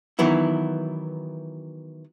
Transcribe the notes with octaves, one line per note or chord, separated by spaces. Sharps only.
D#3 E3 F#3 B3 E4